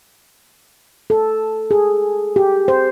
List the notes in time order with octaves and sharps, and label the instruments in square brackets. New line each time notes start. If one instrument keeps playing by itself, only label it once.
[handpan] A4
G#4
G4
C5